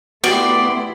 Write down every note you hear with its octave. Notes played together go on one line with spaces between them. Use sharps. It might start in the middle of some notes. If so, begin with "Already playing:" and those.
A3 B3 E4 F#4 G4 D5 B5 C6